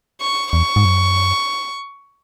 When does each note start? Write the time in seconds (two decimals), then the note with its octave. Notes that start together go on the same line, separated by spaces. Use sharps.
0.21 C#6
0.53 E2 C#6
0.76 G#2
0.85 F#2